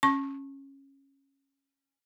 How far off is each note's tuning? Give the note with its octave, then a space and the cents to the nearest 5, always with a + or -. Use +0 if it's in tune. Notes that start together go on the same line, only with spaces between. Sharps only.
C#4 -15 C#6 -25